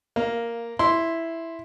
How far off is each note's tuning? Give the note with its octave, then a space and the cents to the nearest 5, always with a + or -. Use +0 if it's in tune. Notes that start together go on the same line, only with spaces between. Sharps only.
A#3 +0 F5 -10
E4 +0 C6 +0